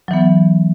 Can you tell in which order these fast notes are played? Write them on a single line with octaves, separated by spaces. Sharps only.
F#3 E3 B3